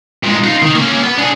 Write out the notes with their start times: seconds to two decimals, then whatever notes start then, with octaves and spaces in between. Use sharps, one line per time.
0.24 A#2 G#3
0.44 D#4 F4
0.62 D#3
0.75 A#3 C#4
1.03 B3
1.18 D4 G#4